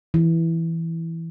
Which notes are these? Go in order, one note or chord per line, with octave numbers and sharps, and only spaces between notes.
E3